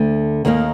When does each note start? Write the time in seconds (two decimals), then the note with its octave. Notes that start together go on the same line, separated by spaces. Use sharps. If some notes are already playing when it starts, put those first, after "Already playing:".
Already playing: D2 D3 A3
0.45 D#2 D#3 G3 A#3